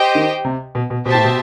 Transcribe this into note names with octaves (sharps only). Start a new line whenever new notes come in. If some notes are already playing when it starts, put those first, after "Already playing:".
Already playing: G4 C5 D#5 G5
D#3
C3
B2
B2
B2 G4 C5 E5 A5
A2
B2